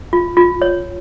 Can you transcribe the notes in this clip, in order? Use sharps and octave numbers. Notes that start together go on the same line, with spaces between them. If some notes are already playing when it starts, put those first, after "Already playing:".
F4
F4
C#5